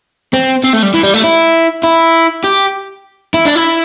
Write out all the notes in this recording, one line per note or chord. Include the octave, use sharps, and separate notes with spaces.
C4
C4
A3
G3
E3
G3
A3
E4
E4
G4
E4
D4
E4